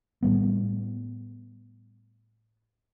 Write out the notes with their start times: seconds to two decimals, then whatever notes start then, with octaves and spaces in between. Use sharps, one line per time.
0.23 A2 G3 B3